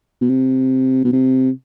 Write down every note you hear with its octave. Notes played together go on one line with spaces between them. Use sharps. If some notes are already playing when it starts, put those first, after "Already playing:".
B2
C3
B2
C3